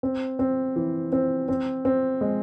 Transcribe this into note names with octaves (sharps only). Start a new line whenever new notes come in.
C4
C4
E3
C4
C4
C4
G#3